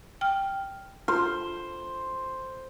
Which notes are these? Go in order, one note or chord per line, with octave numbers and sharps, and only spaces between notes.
G5 F6
F4 C5